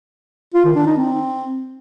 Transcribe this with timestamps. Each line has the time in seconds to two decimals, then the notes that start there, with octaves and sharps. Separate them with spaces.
0.54 F4
0.65 D#3
0.76 D4
0.86 D#4
0.97 C4